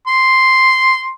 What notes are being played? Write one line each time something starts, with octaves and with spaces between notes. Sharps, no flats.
C6